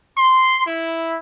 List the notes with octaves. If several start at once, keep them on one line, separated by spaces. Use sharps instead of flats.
C6
E4